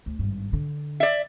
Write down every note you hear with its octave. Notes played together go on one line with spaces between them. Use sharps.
D2
G#1 G2
D3
D5 E5